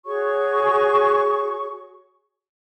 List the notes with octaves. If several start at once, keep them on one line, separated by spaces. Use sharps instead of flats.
F#4 G#4 C#5 C#6